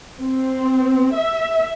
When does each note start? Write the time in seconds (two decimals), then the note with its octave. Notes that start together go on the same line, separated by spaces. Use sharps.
0.20 C4
1.14 E5